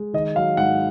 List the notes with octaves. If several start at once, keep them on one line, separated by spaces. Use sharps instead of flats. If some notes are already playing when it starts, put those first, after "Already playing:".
Already playing: G#3
D#3 D#5
F#3 F5
G#2 F#5